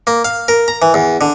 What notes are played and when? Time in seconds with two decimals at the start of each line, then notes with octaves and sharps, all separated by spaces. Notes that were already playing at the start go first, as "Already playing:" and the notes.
0.07 A#3
0.25 F5
0.48 A#4
0.68 A#5
0.82 E3
0.94 E2
1.21 D3